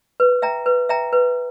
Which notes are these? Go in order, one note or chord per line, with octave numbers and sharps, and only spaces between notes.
B4
E5 G5 A#5
B4
E5 G5 A#5
B4